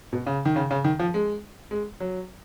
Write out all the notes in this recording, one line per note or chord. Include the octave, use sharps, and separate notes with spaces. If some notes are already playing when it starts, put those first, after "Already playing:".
B2
C#3
D#3
C#3
C#3
D#3
F3
G#3
G#3
F#3